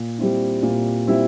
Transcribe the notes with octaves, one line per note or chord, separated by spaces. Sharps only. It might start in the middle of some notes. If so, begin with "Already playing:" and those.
Already playing: A#2
G3 C4 E4
A#2
G3 C4 E4